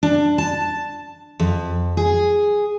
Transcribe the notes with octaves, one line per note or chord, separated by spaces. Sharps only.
D4
A5
F2
G#4